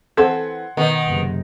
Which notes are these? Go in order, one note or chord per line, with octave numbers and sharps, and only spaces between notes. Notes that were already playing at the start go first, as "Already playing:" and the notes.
E3 C4 A4 F#5 C6 G#6
B2 D#3 B3 D#4
F#1 C3